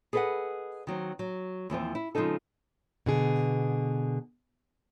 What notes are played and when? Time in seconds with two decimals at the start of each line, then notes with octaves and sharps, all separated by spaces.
0.13 G#4 A4 B4 D5 D#5 F#5
0.87 D#3 F#3 C4
1.19 F#3
1.70 D#2 E3 F3 C4
1.95 E4
2.15 C#3 F3 G#3 C4 D#4 A4
3.06 B2 D3 G#4